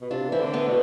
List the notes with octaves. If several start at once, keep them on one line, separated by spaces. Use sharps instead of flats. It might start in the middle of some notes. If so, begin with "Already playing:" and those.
B2
C3 D4 F4
E3 C4 E4
D3
B3 D4
B2